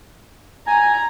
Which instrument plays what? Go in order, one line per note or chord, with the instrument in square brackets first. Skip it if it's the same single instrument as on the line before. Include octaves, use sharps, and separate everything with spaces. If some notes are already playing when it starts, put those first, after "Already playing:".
[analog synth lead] G#5 [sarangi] A#5